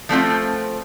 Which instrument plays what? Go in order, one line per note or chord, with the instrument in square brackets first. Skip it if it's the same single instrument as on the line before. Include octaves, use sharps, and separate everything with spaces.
[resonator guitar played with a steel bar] F3 A3 C4 F4